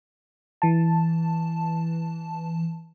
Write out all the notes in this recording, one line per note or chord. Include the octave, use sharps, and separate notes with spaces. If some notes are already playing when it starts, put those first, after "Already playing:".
E3 A5